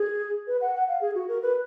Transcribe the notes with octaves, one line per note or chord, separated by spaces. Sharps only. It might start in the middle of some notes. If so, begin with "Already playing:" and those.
Already playing: G#4
B4
F#5
F#5
F5
G#4
F#4
A#4
B4